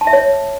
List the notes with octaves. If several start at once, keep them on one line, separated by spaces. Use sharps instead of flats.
A5
E5
C#5